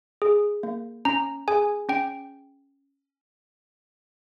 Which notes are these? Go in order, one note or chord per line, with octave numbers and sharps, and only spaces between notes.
G#4
A#3
C#4 A#5
G#4 G#5
C#4 G5